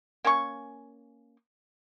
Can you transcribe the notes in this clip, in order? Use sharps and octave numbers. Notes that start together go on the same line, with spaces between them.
A#3 C#4 G#5 C#6